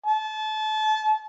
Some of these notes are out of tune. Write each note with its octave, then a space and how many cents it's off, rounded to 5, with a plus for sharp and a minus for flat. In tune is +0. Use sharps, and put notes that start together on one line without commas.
A5 -30